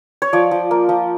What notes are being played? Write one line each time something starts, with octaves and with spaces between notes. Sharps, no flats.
C#5
F3 D5
F3
A#3
F3